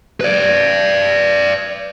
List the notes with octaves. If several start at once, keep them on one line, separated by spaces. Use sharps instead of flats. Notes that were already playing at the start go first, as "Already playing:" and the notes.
B4 D5